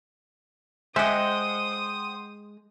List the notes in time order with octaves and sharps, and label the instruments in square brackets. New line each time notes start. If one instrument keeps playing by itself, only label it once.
[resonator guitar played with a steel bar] G#3 D#5 [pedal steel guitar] C5 F#5 G5 [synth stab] E5 [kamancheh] D#6